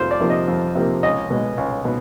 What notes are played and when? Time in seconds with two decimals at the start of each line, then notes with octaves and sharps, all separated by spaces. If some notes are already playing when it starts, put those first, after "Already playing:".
Already playing: F2 C3 F3 C5
0.11 D5
0.20 C3 F3 A#3
0.30 D#5
0.48 F2
0.75 C3 F3 A#3
1.03 C#2 D#5
1.30 B2 G#3
1.58 C#2
1.85 B2